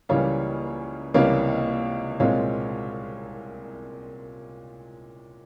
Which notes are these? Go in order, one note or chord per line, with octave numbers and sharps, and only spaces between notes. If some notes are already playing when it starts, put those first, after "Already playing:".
C#2 C#3 E3 G3 A#3 C#5 F5
C#2 C3 E3 G3 A#3 C#5 F5
C2 A#2 G#3 C4 C#5 F5